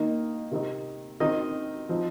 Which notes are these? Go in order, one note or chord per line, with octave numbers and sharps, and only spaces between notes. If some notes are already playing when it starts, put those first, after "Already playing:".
Already playing: D#3 A#3 D#4
C3 D#3 C4 D#4
D#3 C4 D#4 D#5
F3 C4 D#4